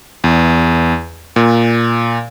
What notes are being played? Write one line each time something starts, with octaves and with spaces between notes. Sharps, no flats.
E2
A#2